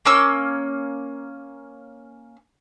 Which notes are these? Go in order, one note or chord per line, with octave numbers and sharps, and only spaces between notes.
A#3 C#4 E6